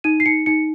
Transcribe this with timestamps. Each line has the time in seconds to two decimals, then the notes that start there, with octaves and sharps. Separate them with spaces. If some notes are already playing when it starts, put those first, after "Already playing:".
0.04 D#4 D#7
0.20 C7
0.26 D#4 C#7
0.46 D#4 C#7